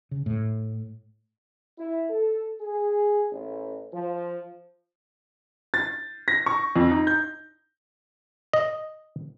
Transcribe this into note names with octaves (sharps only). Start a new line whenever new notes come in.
C#3
A2
E4
A4
G#4
A1
F3
A6
A#6
C#6
F2
D#4
G6
D#5